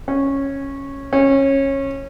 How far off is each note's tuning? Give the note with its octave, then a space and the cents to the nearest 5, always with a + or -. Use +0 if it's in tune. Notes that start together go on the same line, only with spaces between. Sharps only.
C#4 -10
C#4 -20